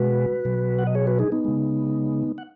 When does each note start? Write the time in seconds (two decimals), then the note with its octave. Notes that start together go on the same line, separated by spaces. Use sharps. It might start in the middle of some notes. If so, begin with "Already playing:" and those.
Already playing: B2 G#3 F#4 B4
0.45 B2 F#3
0.79 F#5
0.87 D#5
0.95 G#4 C#5
1.07 F#4 B4
1.19 D#4 G#4
1.32 B3 D#4
1.45 C#3 G#3
2.38 F#5